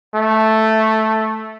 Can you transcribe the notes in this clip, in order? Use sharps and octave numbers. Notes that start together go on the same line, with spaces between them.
A3